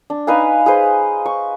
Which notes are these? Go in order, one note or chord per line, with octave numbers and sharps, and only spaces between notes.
D4
D#4 B4 F5 G#5
G#4 B4 C5
C#6